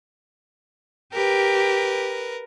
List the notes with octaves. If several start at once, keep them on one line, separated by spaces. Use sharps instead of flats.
G4 A#4 B4